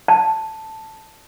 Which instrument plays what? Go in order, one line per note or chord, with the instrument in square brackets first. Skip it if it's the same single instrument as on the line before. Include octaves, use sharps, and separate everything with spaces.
[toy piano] A5